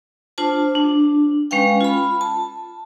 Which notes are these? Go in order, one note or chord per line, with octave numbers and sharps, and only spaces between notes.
D4 F4 C5 A5
D4
G#3 C#4 B4 F5 G5
F4 B5
A5